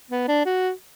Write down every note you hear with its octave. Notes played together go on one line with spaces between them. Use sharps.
B3
D4
F#4